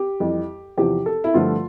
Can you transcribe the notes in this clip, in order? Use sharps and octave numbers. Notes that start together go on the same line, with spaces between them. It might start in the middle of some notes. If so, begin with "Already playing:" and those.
Already playing: G4
F2 E3 G3
E2 C3 F3 G4
A4
E4
G2 D3 F3 A3 F4